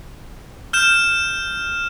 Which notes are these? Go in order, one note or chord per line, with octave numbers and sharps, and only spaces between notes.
F6 G6 E7